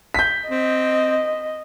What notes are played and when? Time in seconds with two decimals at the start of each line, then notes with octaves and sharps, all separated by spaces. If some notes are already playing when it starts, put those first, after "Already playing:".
0.14 G6 B6
0.49 C4 D#5